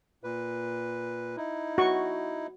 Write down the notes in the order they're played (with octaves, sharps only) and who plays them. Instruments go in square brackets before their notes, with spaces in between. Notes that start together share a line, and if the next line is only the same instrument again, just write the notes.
[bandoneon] A#2 B4
D#4 E4
[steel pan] F#4 C#6